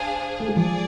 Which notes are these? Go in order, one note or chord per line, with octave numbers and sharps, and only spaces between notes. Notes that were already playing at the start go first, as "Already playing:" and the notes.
Already playing: D4 G#4 C5 F5
A3
G#3
F3 G#4 D5